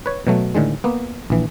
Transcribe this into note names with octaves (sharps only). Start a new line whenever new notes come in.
B4 C#5
B2 F#3 A3
A2 D3 D#3 G#3
A#3 B3
A#1 E3